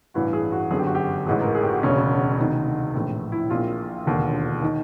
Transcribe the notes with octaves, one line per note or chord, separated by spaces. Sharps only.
A1 G2 E3 F#4
G#4
F#4
G1 F#2 D3 G#4
G4
F#4
G4
A1 G#2 E3 G#4
A#4
G#4
G4
F#4
E1 D2 C#3 C#4
D2 C3 D#3
A#1 A2 E3
E4
A#1 A#2 F4
E1 D#2 D3
D#3